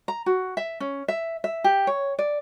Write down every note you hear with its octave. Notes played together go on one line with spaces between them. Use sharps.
A#5
F#4
E5
C#4
E5
E5
G4
C#5
D5